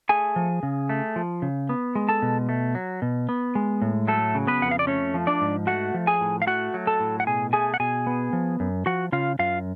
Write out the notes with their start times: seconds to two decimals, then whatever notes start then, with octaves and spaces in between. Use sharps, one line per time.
0.09 A3 G#4 G#5
0.36 F3
0.63 C#3
0.89 A3
1.16 F3
1.42 C#3
1.69 B3
1.95 G#3
2.09 A4 A5
2.22 B2
2.49 A3
2.75 F#3
3.02 B2
3.29 B3
3.55 G#3
3.82 A2
4.07 F#3 A3 A4
4.35 C#3
4.47 B3 B4
4.61 F2 F#5
4.71 F5
4.79 D5
4.87 A3 C#4 C#5
5.14 F3
5.27 D4 D5
5.41 G#2
5.67 A3 F#4 F#5
5.94 F3
6.07 G#4 G#5
6.21 A2
6.42 F5
6.47 A3 F#4 F#5
6.74 F#3
6.87 A4 A5
7.00 A2
7.20 F#5
7.27 B2 G#4 G#5
7.53 A3 G#4 G#5
7.74 F#5
7.80 B2 G#4 G#5
8.07 B3
8.33 F3
8.60 F#2
8.86 F3 F#4 F#5
9.12 C#3 F4 F5
9.39 F#2 F4 F5